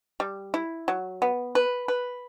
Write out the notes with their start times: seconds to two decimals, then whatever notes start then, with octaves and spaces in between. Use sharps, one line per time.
0.20 G3
0.54 E4
0.88 F#3
1.22 B3
1.55 B4
1.88 B4